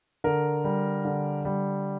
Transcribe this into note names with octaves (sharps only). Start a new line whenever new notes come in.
D3 A#4
G3
D3
G3